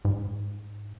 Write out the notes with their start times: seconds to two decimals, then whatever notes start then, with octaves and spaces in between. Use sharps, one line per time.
0.05 G#2